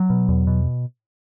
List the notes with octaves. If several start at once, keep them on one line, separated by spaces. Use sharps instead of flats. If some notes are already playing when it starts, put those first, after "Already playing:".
Already playing: F#3
B2
E2
B2